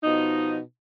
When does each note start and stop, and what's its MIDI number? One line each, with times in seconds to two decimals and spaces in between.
0.04 0.58 47
0.04 0.58 53
0.04 0.58 63